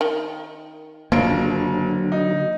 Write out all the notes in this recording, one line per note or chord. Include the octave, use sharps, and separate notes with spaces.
D#3
F#1 D3 F3 F#3 A#3 D7
D#4